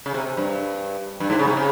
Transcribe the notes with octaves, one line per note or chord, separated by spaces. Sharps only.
C#3
C3
G2
G2
G#2
C#3
C3
C#3